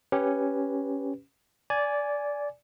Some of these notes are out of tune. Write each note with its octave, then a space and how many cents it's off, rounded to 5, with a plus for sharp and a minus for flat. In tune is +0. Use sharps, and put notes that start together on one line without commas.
C#4 +0 G4 +0 B4 +0
D5 -15 G#5 +5